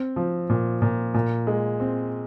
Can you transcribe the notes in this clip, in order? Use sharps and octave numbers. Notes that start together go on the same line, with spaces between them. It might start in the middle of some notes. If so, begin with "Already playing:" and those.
Already playing: C4
F3
A#2
A#2
A#2
G#3
C4